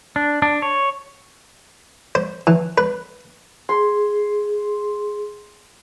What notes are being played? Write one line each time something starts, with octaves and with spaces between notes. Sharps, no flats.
D4
D4
C#5
C5
E3
B4
G#4 C6